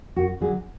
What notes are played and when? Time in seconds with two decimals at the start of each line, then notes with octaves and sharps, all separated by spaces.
0.16 F#2 F#4
0.40 D3 F#3 G#4